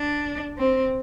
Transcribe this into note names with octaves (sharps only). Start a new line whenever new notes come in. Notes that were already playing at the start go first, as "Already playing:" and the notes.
Already playing: D4
C4